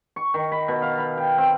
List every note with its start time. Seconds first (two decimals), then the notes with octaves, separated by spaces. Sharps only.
0.16 C#6
0.34 D#3
0.52 B5
0.68 B2
0.82 F5
0.98 B5
1.17 G5
1.38 C4